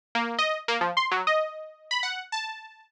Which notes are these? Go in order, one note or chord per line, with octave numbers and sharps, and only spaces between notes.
A#3
D#5
A#3
F3
C6
F#3
D#5
B5
F#5
A5